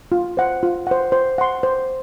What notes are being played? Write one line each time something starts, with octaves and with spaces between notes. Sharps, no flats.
F4
C5 F#5
F4
C5 F#5
C5
F#5 C6
C5